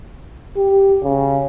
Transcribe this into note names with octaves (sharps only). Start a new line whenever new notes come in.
G4
C#3